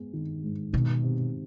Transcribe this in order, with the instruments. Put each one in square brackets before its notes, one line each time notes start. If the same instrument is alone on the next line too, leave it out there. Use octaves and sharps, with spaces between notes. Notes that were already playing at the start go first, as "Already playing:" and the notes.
Already playing: [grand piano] G#2 G#3 B3
D#3
G#2
[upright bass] B2 [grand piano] D#3
[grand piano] C3